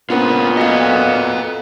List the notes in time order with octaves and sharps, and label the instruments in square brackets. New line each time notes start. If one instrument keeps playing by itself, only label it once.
[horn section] A#2 B3 [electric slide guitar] C#4 F4 [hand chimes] D4 A#4 C5
[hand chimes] F#4 F5 [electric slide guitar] A4 D#5